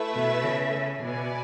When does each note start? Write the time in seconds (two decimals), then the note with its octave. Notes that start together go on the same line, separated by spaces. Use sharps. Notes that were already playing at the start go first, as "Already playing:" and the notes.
Already playing: A3 E4 B4 E5
0.14 B2
0.43 C#3
1.03 B2 E4 B4 D5 G#5